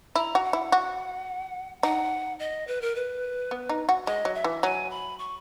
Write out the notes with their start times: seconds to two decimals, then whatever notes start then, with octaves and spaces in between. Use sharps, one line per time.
0.16 E4 A#5
0.35 F#4
0.44 F#5
0.53 E4
0.72 F#4
1.83 D#4 F#5
2.39 D#5
2.67 B4
2.81 A#4
2.96 B4
3.51 B3
3.69 D#4
3.89 F#4
4.07 G#3 D#5
4.25 F#3
4.35 E5
4.44 E3
4.63 F#3 G#5
4.91 B5
5.19 C#6